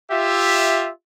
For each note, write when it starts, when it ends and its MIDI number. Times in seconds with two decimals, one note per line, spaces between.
0.11 0.89 65
0.11 0.89 67
0.11 0.89 76